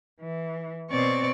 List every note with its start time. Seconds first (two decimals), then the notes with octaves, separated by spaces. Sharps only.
0.20 E3
0.90 B2 C4 C#5 D5 C#6